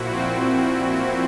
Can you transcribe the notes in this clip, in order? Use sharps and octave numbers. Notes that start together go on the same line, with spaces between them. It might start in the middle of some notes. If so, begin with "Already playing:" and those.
Already playing: A#2 F3 E4 F#4
C4